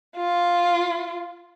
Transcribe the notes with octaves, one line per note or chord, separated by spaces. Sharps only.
F4